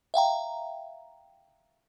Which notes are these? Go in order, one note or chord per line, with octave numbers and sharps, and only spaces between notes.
E5 F5 G5 A#5